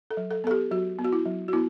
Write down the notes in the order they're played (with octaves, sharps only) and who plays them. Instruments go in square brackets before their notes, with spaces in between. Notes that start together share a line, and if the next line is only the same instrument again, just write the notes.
[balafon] A4
F#3
A4
B3 A4
G4
F#3 F#4
B3
F#4
E4
F#3
F#4
B3 E4